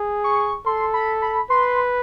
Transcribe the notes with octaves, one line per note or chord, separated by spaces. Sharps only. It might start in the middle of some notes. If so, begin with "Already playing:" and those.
Already playing: G#4
C#6
A4 C6
B5
B5
B4 C6